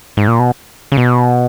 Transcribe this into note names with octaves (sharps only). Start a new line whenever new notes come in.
G#2
A#2
B2
C#3
B2